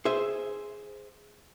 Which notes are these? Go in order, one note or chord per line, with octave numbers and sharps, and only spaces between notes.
G#4 C5 E5